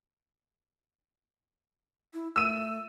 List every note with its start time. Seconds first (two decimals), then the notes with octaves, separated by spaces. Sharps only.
2.14 E4
2.36 A3 E6 D#7